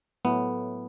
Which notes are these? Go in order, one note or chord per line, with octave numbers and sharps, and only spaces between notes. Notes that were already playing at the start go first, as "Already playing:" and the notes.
A2 F#3 A3 B3